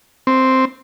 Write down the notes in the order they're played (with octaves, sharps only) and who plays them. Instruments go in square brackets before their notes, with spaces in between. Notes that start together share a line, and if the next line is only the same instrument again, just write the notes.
[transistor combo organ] C4